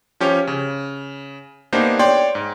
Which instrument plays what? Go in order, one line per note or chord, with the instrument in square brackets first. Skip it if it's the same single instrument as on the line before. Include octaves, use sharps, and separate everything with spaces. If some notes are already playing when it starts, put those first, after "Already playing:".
[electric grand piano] F3 C#4 G4 C#5
C#3
A#3 B3 D4 D#4 G4 C5
C#5 D5 G5 C6
G#2